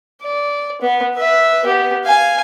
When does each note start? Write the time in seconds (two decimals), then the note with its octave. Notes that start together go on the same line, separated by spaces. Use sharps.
0.23 D5
0.81 B3
1.16 B4 E5
1.65 B3 G4
2.05 F5 G#5